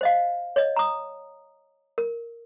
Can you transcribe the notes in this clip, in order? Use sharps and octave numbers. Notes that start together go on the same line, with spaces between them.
C5 D#5 F5
C#5 D#5
A#5 D#6
A#4